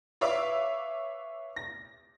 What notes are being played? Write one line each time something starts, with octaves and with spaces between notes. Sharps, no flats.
B4 C#5 E5 F5 D6
A#6